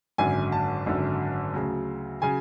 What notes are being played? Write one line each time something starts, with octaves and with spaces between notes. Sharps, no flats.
G#1 F#2 D3 G#5
A5
G#1 F#2 D3
D2 C#3 F#3
C#3 F#3 G#5